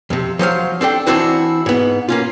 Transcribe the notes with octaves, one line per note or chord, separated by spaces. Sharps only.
F2 C3
F3 F#3 C5 F5
C4 D4 A4 G5
E3 C4 D4 E4 F#4 C5
G#2 B3
A#3 C#4 F4